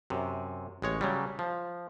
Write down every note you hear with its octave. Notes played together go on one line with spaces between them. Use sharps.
F#2 C3
A1 G#3 C#5
C#3 F#3 G3
F3